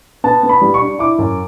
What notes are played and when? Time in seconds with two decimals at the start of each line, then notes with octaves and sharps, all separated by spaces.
0.24 B3 A5
0.43 B3
0.49 B5
0.61 G3
0.74 C#6
0.81 D4
0.99 E4 D6
1.18 F#2